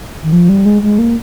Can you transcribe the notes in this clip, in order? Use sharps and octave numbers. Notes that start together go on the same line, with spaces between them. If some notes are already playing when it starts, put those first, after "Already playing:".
D#3
F3
G3
G#3
G#3
A#3